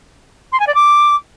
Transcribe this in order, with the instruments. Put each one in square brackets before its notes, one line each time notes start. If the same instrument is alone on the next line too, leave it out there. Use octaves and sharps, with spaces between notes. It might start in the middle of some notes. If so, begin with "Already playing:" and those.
[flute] C6
G#5
D5
D6